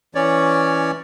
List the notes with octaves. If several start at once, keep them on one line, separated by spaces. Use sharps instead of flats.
E3 C#4 C#5 D5